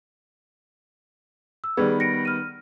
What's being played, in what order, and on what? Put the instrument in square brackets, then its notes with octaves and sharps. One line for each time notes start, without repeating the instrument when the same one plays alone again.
[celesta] E6
[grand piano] D#3 G3 B3 [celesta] G#4 B4 G#6
[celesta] A#6 C#7 D7
F6 D#7